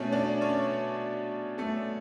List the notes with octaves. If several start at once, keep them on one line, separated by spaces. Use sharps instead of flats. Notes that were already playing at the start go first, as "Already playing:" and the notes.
Already playing: B2 A3 C#4 C#5
D4 D5
C#4 C#5
A3 A4